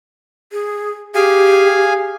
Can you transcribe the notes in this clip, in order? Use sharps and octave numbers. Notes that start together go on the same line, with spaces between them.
G#4
G4 G#4 F5 G#5